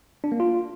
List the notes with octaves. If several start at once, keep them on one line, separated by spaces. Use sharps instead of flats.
D4
A#3
F4